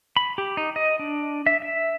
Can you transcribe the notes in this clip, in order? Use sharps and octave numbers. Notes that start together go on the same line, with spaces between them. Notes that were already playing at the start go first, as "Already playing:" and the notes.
B5
G4
D#4
D#5
D4
E5
E5